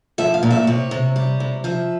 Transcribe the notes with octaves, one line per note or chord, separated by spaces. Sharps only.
F3 E5
F5
A#2
E5
C3 C#5
C3
G3
C3
F3 E5